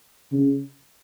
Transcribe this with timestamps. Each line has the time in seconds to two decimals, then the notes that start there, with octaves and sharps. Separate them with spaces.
0.32 C#3